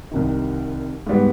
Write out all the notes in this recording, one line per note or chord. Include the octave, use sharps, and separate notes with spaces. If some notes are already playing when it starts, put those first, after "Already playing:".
C2 C3 D#3
G#2 G3 B3